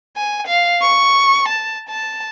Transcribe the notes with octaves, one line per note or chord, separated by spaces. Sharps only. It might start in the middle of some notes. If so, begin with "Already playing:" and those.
G#5
F5
C#6
A5
A5